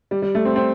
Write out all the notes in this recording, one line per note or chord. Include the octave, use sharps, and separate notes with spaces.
G3
G3
A3
C4
C4